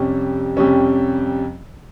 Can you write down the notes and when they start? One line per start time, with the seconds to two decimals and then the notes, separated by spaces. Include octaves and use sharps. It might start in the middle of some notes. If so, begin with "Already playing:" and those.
Already playing: F2 C3 G3 C#4
0.57 F2 C3 G3 C#4